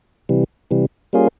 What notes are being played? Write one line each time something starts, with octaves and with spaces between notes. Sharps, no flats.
C3 E3 G3
C3 E3 G3
G3 A#3 C#4 F4 G#4